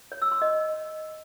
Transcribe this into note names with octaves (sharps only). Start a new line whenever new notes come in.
C#5
E6
C6
D#5